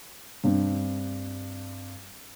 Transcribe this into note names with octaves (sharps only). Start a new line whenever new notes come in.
G2 C4